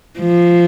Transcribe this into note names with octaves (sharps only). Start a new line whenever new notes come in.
F3